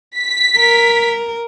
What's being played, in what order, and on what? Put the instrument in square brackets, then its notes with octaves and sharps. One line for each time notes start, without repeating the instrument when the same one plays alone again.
[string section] B6
[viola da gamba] A#4